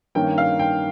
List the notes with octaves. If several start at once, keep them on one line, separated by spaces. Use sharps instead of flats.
G2 D#3 A#3 C#4 G5
F5
G5